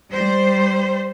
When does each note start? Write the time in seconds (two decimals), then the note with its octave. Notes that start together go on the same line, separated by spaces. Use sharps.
0.10 G3 C5